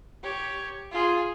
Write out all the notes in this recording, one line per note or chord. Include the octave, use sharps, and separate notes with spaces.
G4 C#5
F4 G#4